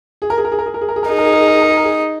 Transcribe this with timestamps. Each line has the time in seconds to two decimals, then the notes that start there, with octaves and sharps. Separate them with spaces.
0.22 G#4
0.30 A#4
0.37 G#4
0.45 A#4
0.52 G#4
0.59 A#4
0.66 G#4
0.74 A#4
0.81 G#4
0.89 A#4
0.96 G#4
1.03 A#4
1.10 D#4 G#4
1.18 A#4
1.25 G#4
1.33 A#4
1.41 G#4
1.47 A#4
1.54 G#4
1.62 A#4
1.70 G#4
1.77 A#4
1.84 G#4